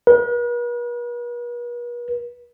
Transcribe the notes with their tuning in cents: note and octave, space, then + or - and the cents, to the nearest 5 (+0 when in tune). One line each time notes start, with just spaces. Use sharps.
B4 -45